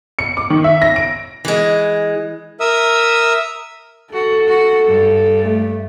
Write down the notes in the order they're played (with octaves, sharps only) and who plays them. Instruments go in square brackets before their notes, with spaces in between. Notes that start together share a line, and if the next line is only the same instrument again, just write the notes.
[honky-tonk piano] C#7
D6
D#3
E5
A#6
D7
[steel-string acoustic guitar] E3 G#3
[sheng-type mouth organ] A#4 E5 D#6 E6
[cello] F#4 [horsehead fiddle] A4
[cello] F#4
G2
[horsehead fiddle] A3